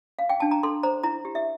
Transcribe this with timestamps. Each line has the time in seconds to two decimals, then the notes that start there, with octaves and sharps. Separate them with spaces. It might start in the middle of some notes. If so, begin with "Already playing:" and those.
0.19 F5
0.29 G5
0.40 D4 A5
0.51 A#5
0.63 A4 C6
0.83 C5 A#5
1.03 E4 A#5
1.25 G4
1.35 E5